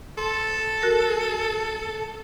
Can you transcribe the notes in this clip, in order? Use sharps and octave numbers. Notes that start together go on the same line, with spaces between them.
A4 C6
F#4 A#4